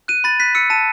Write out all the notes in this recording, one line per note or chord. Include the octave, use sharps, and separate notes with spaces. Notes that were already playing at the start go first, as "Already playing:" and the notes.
F#6 D#7
B5 A6
F#6 B6
E6 C#7
A5 D#7